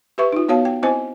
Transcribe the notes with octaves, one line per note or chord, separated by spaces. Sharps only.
G4 B4 E5 C#6
D#4 F4
B3 F#4 C#5 F5 A5
G5
C4 E4 C5 D#5 G#5